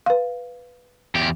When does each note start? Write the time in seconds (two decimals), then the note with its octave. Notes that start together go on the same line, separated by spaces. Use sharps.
0.06 B4 F5
1.15 E2 G4